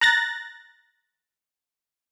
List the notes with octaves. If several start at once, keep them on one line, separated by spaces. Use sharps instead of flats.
A#5 F#6 A6 A#6